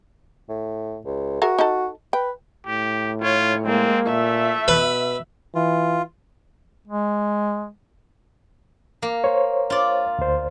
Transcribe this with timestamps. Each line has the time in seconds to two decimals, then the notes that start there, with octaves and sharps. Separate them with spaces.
0.49 A2
1.05 C#2
1.42 F#4 G#4 A#4 E5
1.59 D#4 A4
2.13 B4 G5
2.66 A2 G4
3.22 F4 C#5
3.65 G#3 A#3 C4
4.06 A#2 A3 E5
4.68 B2 B4
5.55 E3 F4
6.88 G#3
9.02 A#3
9.24 C5 C#5
9.70 F4 D5
10.19 D2 C5